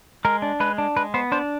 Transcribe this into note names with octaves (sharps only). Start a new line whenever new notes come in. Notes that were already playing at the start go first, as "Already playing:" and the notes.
G#3 A#4
D4
G#3 B4
D4
G#3 B4
B3 C5
D4 C5